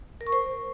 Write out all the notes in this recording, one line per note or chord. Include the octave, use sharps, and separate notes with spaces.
A#4
C#6
C5